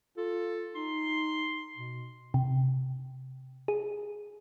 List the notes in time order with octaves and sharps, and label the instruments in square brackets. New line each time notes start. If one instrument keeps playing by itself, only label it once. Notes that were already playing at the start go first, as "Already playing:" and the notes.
[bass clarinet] F4 [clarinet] A4
[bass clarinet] D#4 [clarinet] C6
[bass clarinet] B2
[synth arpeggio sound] C3
G#4